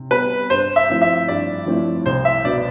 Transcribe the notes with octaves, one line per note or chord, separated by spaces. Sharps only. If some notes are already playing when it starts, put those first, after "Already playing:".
Already playing: C3
G3 B3 B4
G2 C5
E5
F3 A3 C4 E4
E5
G2 D5
F3 A3 C4 E4
C2 C5
E5
B2 B3 D5